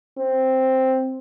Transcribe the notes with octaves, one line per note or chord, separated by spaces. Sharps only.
C4